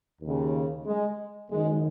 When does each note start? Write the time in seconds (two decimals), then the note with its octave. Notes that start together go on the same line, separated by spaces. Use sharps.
0.21 D#2 C#3
0.86 G#3
1.49 F#1 F#2 D#3 G#3